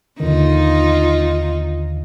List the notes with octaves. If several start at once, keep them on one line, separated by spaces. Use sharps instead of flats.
D#2 D3 D#3 D#4 F4